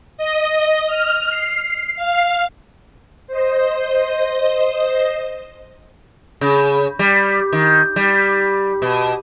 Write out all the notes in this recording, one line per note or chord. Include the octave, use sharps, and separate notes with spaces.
D#5
F6
C7
F5
C5 D#5
C#3
G3
D#3
G3
B2